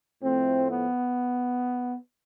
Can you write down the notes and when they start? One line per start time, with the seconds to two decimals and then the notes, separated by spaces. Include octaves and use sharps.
0.22 A2 F3 A3 C4
0.69 B3